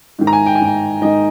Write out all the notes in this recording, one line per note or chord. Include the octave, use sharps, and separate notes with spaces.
G#2 D#3
A#5
G#5
G5
G#5
G#2 D#3 G5
G#2 D#3 D#5